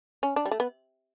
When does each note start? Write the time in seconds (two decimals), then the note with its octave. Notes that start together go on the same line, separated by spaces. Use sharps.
0.23 C#4
0.36 D4
0.46 G3
0.51 A3
0.60 B3